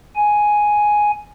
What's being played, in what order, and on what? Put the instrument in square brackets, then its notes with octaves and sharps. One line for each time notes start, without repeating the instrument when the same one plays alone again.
[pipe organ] G#5